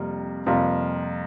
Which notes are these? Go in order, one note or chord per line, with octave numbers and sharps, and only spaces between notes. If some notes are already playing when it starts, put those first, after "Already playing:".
Already playing: F2 C3 G3 A#3
F2 C3 G3 A#3 F4